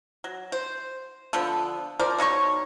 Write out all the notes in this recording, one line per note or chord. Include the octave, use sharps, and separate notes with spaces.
F#3
C5
D3 F3 B3 A4
F3 A#4 C5 D5
B2 D#4 C#5 C#6